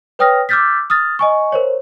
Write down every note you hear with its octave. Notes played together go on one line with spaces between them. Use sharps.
B4 C#5 G5 D#6 F6 A#6
D6 E6 F6 G6 A6 B6
D#6 F6 A6
D#5 G#5 C#6
A#4 C5 C#5